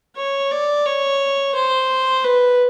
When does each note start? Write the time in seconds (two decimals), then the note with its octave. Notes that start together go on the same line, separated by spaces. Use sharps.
0.17 C#5
0.51 D5
0.86 C#5
1.55 C5
2.24 B4